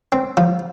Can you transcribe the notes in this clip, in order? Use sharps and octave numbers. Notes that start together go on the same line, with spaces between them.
C4
F3